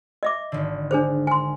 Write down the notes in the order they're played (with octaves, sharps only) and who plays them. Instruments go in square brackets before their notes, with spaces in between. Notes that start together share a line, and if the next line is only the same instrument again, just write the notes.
[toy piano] D#5 E5 D6
[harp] G#1 D3
[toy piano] D4 G#4 C5
G#5 C6